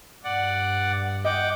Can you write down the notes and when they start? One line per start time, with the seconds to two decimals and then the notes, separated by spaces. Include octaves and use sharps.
0.24 G2 D5 F#5
1.24 D#5 F#5 G5 D6